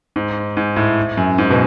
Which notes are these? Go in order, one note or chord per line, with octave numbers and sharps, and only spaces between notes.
G#2
G#2
A2
F#2
G#2
B2